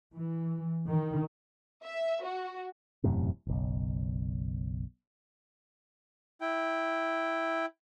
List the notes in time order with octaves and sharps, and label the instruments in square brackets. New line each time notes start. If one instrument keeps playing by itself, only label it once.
[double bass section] E3
D#3
[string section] E5
F#4
[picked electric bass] E1 F#2 A2 C3
F#1 B1
[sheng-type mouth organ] E4 G5